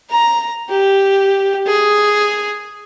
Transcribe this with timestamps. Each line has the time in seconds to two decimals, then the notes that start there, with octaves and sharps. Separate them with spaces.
0.11 A#5
0.69 G4
1.67 G#4